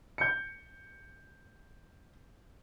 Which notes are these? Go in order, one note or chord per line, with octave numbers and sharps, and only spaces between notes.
G6 C#7